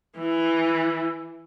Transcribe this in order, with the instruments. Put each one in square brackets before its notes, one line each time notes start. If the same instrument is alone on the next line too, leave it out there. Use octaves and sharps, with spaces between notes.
[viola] E3